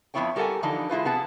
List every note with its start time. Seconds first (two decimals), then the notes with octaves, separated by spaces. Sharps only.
0.14 F2 F3 B3 E4 C#5 G5
0.36 G3 G4 A4 A#4 F#5 G#5
0.63 D3 E3 F3 D4 D#4
0.89 G#3 E4 F4 B4
1.05 C3 B3 G#4 F#5 A5